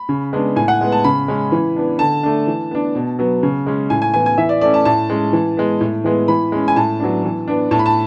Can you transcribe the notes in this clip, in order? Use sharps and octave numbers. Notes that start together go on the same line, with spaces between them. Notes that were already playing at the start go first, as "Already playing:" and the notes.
Already playing: B5
C#3
G#3 B3 D4
A2 G#5
F#5
G#3 B3
A5
C#3 B5
G#3 C#4
E3
B3 D4
D3 A5
A3 D4
E3
B3 D4
B2
F#3 B3
C#3
G#3 C#4
A2 G#5
G#5
E3 B3 G#5
G#5
E3 E5
D5
A3 C#4 D5
A5
A2 A5
G#3 C#4
E3
G#3 B3
A2
E3 G#3 B3
E3 B5
G#3 C#4
G#5
A2 A5
F#3 B3 D4
E3
B3 D4
A2 A5
B5
A5